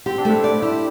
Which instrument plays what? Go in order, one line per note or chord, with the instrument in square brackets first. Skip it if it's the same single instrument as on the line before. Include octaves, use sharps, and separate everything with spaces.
[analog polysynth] C4 [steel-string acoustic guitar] G4
[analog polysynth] D4
[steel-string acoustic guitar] A3
[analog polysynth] E4
[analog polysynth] G4 [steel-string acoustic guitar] D5
[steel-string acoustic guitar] E4 [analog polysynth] G4